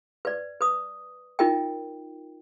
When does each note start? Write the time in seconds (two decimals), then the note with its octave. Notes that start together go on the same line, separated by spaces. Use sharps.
0.25 B4 D5
0.61 B4 D#6
1.39 D#4 F4 A#4 D#5 G5